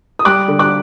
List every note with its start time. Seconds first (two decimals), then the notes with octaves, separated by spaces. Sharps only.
0.19 D#6
0.25 G3 D6 F#6
0.48 D3
0.59 D6 F#6